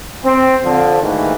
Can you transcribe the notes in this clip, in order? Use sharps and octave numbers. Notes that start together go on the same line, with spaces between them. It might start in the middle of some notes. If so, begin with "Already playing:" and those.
C4
D3 F3
D2 G#2 D#3 E3 A#3